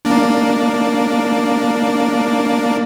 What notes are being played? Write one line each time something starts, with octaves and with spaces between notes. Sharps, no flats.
A#3 D4